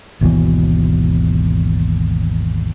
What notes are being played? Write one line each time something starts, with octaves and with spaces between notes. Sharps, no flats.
G#1 D#2 B2 E3